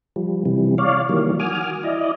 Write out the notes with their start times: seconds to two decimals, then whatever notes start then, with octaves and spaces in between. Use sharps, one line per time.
0.16 F3 G3
0.45 C3 E3 G3
0.78 C#5 D5 F5
1.09 D#3 E3 F#3 G3 A#3
1.39 F#4 G#5 D6 D#6 F6
1.83 E4 D5 D#5